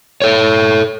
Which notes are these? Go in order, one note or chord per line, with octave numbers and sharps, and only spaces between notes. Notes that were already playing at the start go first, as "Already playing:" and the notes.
A4 C#5